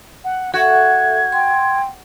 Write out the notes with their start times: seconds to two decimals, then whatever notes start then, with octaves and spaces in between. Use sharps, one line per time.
0.25 F#5
0.54 F#4 A4 E5 G#6
1.32 G5 C6